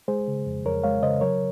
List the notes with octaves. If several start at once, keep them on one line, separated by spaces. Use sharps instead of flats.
G#3 G#4 C5
C#3
F2
F2 A#4 C#5
G#3 C#5 F5
C#3 C5 D#5
F#3 A#4 C#5